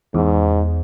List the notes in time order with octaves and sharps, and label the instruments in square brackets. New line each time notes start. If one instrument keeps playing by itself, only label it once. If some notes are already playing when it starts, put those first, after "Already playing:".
[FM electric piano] E2 [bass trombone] G#2